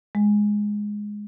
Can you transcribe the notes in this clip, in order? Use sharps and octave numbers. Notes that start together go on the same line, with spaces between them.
G#3